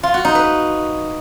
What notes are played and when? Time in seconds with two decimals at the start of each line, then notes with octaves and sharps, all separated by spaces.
0.03 F4
0.14 F#4
0.25 D#4
0.35 B4